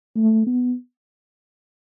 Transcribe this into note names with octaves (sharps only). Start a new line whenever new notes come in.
A3
B3